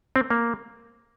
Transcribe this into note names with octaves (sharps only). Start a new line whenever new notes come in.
C4
A#3